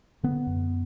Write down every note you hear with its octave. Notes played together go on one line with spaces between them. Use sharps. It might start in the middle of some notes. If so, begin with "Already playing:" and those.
D3 B3
F#2